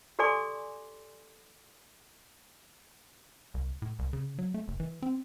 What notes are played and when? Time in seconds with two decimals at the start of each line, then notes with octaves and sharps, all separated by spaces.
0.19 G4 A4 D5 G#5 C6 D6
3.54 C2
3.82 A2
3.99 C2
4.13 C#3
4.39 F#3
4.54 A3
4.68 F1
4.80 E3
5.02 C4